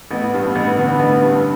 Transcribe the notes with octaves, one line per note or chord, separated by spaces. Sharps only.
A1 B3
G2
B3
A1
D3 B3
A1
G2